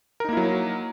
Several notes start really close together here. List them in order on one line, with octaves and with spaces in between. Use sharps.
A#4 D#4 A#3 E4 F#3